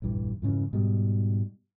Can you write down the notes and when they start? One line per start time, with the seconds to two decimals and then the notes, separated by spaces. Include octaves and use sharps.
0.02 F1 A#1 G2 E3
0.42 F2 G#2 C#3 E3
0.73 G#2 B2 G3